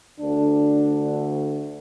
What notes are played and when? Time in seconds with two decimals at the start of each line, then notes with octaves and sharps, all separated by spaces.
0.19 D2 D3 D4